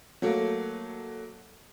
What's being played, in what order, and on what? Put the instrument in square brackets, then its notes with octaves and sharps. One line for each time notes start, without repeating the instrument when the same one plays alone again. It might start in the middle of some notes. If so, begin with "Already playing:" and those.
[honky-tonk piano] F#3 A3 A#3